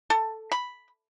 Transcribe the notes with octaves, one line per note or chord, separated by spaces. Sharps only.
A4
B5